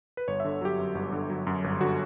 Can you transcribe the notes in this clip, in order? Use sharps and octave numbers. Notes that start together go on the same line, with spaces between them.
B4
G1 C#5
E5
D3
F#3 G4
F#2
G1
D3
F#3
F#2
G1
D3 F#4